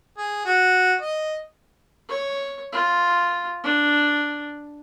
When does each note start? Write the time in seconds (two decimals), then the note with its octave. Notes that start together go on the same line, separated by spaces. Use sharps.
0.18 G#4
0.45 F#4
1.01 D#5
2.09 C#5
2.73 F4
3.64 D4